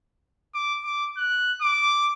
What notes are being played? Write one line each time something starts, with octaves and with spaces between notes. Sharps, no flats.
D6
D6
F#6
D6